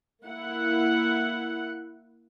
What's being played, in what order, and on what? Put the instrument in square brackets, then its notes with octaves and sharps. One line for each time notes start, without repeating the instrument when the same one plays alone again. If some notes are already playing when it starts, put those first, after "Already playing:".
[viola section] A#3 E4 F#5